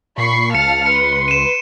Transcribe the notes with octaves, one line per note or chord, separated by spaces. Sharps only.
A#2 B5 C#6 C7
C#2 F5 A5 F6 C#7
B4 C6 C#7
D#7 E7